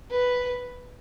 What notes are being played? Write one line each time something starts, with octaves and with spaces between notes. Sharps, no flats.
B4